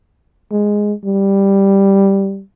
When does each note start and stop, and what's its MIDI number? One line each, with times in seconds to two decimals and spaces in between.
0.51 0.93 56
1.05 2.42 55